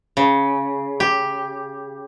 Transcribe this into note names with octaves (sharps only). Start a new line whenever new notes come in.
C#3
G4